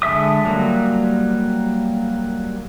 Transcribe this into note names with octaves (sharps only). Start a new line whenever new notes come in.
D3 G#3 A4 E5 D#6
F#3 G3 A#3